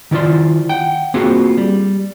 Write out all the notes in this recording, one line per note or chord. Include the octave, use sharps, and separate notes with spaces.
D#3 E4 F4 D5 C6
F#5 G5
A#3 C4 F4 F#4 G#4
G3